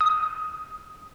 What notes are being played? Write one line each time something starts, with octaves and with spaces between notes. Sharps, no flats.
D#6